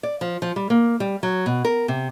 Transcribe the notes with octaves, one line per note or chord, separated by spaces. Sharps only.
D5
F3
F3
G3
A#3
G3
F#3
B2
A#4
C3